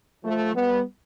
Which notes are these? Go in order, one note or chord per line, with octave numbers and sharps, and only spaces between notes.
F3 A3
G3 B3